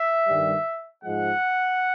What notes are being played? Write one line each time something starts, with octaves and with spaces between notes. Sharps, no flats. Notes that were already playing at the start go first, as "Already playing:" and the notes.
Already playing: E5
G2 D#3 G3
G#2 F3 G#3 F#5